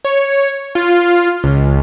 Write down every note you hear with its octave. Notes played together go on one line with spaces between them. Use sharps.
C#5
F4
C#2